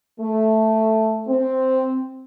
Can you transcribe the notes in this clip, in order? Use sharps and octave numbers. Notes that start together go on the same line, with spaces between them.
A3
C4